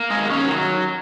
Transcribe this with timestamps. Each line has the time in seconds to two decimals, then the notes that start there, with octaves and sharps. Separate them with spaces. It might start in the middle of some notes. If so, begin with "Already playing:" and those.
Already playing: A#3
0.10 G#3 G#4
0.17 D#3
0.30 C#4 C#5
0.44 F#3